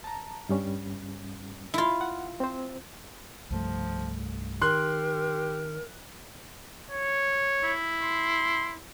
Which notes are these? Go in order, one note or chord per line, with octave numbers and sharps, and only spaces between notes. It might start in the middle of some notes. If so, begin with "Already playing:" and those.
A5 A#5
G2 G3 C#4
E4 F4
F#5
C4 C5
C2 G2 F3 A3
D#3 G4 A#4 C6 F#6
C#5
E4
C6